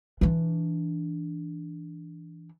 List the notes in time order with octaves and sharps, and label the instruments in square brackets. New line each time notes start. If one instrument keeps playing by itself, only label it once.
[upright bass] E3 D4